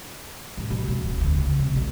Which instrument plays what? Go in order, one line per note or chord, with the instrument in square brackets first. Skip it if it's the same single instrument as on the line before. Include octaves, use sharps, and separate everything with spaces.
[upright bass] A1
B1
F#2
D#1
D2
C#3
C2
B1